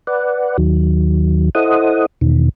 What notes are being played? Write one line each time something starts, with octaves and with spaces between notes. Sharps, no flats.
B4 D5 F#5
D#2 D#3 F#3
E4 A4 C5 D#5 F#5 D#6
E2 B2 D#3